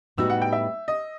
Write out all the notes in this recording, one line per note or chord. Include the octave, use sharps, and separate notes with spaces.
A2 G3 B3 D#4 F#4 E6
F#5
G5
E5
D#5